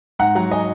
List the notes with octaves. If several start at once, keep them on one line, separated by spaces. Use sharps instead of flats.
G#2 F#5 A#5
F#3 F#5 A#5
D#5 G#5